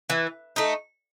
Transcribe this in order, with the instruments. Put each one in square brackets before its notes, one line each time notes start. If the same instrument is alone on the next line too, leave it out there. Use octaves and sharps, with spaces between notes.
[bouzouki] E3
A3 D#4